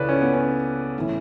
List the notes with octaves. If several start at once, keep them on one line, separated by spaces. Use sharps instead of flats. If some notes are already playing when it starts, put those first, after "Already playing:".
Already playing: C#2 C#3 E3 A4 B4 C#5 D5
C#4
B3
C#4
A2 E3